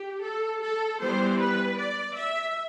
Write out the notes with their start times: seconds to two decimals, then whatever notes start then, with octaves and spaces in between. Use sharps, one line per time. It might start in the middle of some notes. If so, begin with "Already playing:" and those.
Already playing: G4
0.23 A4
0.61 A4
1.00 E3 G3 B3 C5
1.39 B4
1.78 D5
2.16 E5